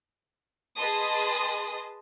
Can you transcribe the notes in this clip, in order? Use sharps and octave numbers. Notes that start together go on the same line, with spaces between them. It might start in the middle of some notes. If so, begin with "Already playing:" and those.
G#4 B4 D#5 A5 C6 D#6